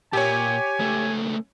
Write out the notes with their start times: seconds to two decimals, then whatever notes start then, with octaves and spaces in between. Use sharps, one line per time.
0.13 A#2 G4 C#5 G#5
0.80 C#2 A3